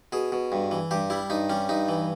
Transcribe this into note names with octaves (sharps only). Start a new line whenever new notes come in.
B2 G#4
B2
G2
E3
G2 G4
G3 E4
G2 D#4
G3 C#4
G2 D#4
E3